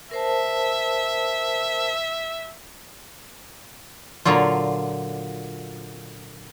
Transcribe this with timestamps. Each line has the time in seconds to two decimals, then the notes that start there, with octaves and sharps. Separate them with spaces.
0.11 A#4 C5 E5 A5
4.25 A#2 D3 F#3 F4